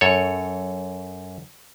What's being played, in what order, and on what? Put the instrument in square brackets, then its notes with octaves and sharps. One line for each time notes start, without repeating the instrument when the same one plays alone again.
[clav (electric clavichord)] F#2 A4 C#5